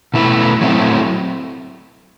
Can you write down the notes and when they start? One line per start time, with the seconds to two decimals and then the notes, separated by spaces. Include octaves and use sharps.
0.14 B2 A3 E4 B4
0.61 F#3 A3 C4 E4